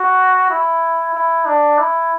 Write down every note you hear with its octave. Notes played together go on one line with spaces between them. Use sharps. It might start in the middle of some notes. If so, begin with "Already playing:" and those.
Already playing: F#4
E4
E4
D4
E4